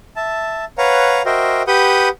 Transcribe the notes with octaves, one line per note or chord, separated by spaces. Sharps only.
E5 A5
B4 C#5 F5 F#5 A#5
F#4 A#4 C5 D#5 E5 G5
G4 B4 F#5 B5 D#6 G6